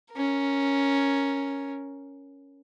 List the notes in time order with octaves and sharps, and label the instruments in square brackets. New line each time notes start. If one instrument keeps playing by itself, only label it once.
[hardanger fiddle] C#4 A#4